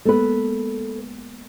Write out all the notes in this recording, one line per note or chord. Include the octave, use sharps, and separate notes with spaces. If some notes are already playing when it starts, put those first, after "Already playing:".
G#3 A#3 B3 A4 B4